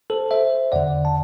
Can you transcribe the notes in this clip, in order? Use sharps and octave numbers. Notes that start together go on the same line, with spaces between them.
A4 C5
C5 E5
E2 D3 D5 F#5
A5